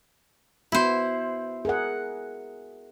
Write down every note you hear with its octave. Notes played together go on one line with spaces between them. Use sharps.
B3 E4 F#4 C5
G#4 A#4 F#5